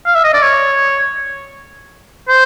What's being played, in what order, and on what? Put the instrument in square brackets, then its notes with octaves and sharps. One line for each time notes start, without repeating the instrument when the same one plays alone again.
[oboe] F5
E5
D#5
D5
C#5
C5